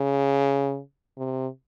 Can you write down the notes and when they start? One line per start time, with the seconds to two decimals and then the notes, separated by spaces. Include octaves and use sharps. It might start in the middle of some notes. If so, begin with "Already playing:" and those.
Already playing: C#3
1.18 C3